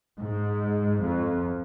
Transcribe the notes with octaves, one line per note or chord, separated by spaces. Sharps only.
G#2
F2